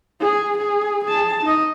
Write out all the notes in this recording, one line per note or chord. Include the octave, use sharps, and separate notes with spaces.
G#4
G#4
G#4 A5
D#4 D#5